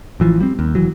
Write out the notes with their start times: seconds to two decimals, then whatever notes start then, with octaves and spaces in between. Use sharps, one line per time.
0.20 A1 E3 F3
0.40 G3 C4
0.59 D#2
0.75 F1 E3 F#3